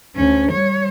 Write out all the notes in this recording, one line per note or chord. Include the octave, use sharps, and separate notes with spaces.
D2 C#4
G3 C#5